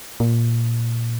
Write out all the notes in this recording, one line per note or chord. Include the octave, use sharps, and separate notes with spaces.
A#2